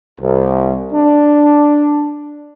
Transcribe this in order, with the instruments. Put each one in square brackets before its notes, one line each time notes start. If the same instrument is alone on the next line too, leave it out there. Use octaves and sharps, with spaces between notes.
[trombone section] C2
D4